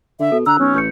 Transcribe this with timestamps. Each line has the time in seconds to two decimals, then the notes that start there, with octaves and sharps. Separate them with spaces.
0.20 D3 E5
0.32 B2 A4
0.46 D3 A#5 E6 F#6
0.59 B1 C#4
0.74 A1 C#6 G6 C#7